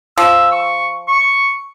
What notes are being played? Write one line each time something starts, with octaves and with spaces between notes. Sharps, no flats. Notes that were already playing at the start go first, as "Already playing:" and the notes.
F3 E6
C#6
C#6